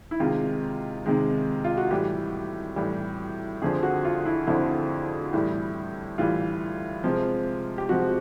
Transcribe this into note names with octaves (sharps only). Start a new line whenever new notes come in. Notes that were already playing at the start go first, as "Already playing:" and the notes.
E4
C3 D#3 G#3 F4
C3 D#3 G#3
F4
F#4
A2 E3 G3 G4
A2 E3 G3
F2 D3 F3 G#4
F#4
F4
E4
F2 D3 F3 E4
A2 E3 G3
A2 E3 G3 F4
C3 F3 G#3
G4
C3 F3 G#3 F#4